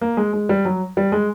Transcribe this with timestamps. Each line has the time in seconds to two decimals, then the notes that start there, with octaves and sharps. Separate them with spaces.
0.01 A#3
0.17 G#3
0.34 G#3
0.49 G3
0.65 F#3
0.97 G3
1.12 G#3